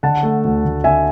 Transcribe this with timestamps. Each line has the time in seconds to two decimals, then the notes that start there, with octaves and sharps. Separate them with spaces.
0.03 D3 F#5 A5
0.23 A3
0.44 D2
0.65 D2
0.84 D3 E5 G#5